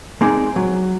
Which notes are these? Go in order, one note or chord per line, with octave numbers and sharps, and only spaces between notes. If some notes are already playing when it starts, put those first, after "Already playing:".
G#3 C4 D#4 G#4 D5
F#3